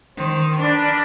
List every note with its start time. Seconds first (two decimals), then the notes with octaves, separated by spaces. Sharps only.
0.17 D#3 C5
0.60 D4 A#4 B4 D5